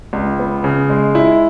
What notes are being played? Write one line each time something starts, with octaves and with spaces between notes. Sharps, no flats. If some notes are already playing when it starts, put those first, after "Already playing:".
C#2
B3
C#3
G#3
E4